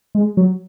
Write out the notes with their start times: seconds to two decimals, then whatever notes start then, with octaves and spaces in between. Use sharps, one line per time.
0.15 G#3
0.37 F#3